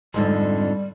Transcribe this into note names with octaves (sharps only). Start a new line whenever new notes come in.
F2 G#2 D3 G3